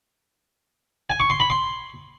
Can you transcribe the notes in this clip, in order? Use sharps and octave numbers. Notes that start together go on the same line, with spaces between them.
G#5
C#6
C6
B5
C6